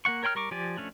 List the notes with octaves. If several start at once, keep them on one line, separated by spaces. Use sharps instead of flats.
A#3 C4 F#5 C#6
A#4 C#5 G5 C6 F6
G3 A#4 C#6 D6
F3 G4 D5 G#5
F3 A3 C#4 D4